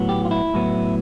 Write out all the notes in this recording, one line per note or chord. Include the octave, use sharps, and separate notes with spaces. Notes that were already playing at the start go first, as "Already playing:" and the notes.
Already playing: A2 F#3 B3
G4
F4
E4
A2 F#3 B3